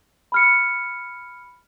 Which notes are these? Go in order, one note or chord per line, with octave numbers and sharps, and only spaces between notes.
B5 F6 C#7